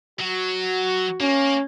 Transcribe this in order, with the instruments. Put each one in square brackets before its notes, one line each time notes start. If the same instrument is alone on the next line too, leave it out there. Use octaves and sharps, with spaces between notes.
[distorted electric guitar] F#3 [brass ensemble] F#4
[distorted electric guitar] A#3 [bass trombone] C#4